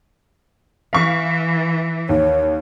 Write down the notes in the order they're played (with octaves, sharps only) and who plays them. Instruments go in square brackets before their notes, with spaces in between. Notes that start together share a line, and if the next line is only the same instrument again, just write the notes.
[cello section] E3 [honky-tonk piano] F5 C#6
[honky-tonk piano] D#2 [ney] C#5